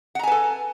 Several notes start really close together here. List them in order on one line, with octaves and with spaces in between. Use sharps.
F#5 A#5 G#5 B4 A4